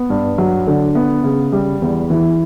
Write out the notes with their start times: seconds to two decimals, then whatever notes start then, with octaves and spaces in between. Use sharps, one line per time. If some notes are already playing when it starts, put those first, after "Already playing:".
Already playing: B3
0.10 G2
0.38 F#3
0.67 D3
0.95 B3
1.24 C#3
1.52 G3
1.82 E2
2.10 E3